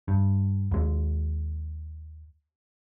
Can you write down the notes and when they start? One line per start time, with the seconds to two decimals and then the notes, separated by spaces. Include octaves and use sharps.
0.08 G2
0.71 D#2 G#3